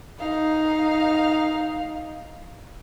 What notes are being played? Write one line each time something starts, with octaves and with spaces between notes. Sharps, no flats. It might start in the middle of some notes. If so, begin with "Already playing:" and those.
D#4 F5